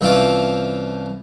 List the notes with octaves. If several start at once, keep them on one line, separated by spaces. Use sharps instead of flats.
C2 E3 F3 C#4 F4 D6